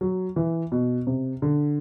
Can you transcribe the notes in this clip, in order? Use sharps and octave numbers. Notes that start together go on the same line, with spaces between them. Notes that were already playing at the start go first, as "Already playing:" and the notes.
F#3
E3
B2
C3
D3